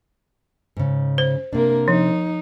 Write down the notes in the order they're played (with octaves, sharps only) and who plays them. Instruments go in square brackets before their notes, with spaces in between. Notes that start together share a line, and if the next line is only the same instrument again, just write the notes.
[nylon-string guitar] G#2 C#3
[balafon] C5
[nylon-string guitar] C3 D4 [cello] A#3 A#4
[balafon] F3 [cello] D#4